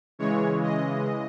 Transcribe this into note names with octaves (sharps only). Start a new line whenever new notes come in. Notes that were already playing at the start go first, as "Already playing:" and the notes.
C#3 E3 G#3 C#5
D#5